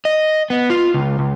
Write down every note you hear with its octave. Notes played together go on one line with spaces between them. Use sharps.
D#5
B3
F4
C#2
C#2